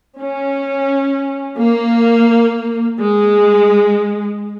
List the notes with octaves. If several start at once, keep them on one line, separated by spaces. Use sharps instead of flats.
C#4
A#3
G#3